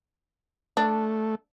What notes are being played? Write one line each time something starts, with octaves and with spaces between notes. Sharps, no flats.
A3 D4